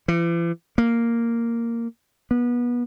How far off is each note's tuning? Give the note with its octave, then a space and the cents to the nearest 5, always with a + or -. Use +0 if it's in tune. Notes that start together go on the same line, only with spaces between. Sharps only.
E3 +45
A#3 -5
B3 -30